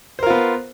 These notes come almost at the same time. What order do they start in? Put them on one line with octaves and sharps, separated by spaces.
C5 A#4 F4 B3